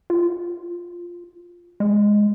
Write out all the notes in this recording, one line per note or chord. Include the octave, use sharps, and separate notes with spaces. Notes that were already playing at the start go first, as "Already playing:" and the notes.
F4
G#3